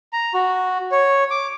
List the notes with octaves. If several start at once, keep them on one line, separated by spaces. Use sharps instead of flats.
A#5
F#4
C#5
D6